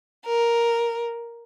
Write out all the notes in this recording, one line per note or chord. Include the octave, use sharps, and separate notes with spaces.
A#4